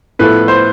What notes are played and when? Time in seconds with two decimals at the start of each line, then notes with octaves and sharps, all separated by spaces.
0.19 A2 F3 B3 E4 A4 B4
0.48 C5